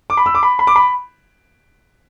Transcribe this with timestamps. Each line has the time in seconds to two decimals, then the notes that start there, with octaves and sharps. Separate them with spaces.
0.10 D6
0.17 B5
0.26 E6
0.35 D6
0.43 B5
0.59 B5
0.67 D6
0.76 B5